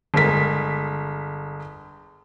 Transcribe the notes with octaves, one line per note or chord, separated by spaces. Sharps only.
G1 G#3 A#4 B6